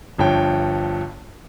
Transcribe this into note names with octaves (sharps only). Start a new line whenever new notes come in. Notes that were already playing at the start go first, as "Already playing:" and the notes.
G1 G2 F3 C#5 G5